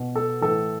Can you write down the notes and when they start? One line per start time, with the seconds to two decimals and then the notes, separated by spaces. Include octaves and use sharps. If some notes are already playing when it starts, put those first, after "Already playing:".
Already playing: B2
0.16 A4
0.42 A2 E3 A4